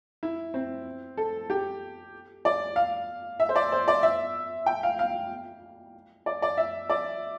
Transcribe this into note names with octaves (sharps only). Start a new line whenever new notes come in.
E4
C4
A4
G4
D5
F5
E5
C5
D5
C5
D5
E5
G5
F5
F5
D5
D5
E5
D5